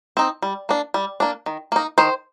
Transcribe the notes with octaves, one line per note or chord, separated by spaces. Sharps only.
C4 D#4
G3
A#3 D4
G3
A#3 D4
D#3
A#3 D#4
D#3 C5